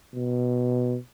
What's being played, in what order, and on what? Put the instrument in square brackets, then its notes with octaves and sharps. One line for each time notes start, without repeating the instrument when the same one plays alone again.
[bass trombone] B2